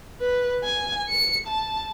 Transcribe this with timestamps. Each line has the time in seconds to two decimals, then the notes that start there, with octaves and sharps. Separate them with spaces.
0.20 B4
0.64 G#5
1.10 C#7
1.47 A5